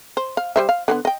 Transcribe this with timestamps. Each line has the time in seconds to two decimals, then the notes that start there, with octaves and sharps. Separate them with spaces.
0.17 C5
0.37 F5
0.56 G3 C5 E5
0.69 F5
0.88 D3 G#3 B3
1.05 D#5 G5